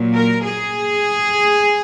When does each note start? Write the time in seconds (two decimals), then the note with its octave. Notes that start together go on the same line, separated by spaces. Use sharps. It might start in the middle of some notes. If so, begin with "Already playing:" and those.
Already playing: A#2 F#3
0.14 A#4
0.44 G#4